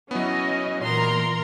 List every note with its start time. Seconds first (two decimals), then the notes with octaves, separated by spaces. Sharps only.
0.11 F#3 B3 C#4 E4 D#5
0.81 A#2 E3 A#4 A#5 C6